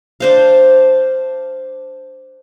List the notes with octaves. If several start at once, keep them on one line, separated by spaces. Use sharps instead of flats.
D4 C5 F5